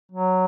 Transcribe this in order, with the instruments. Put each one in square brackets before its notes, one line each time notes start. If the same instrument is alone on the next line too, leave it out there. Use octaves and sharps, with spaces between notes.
[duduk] F#3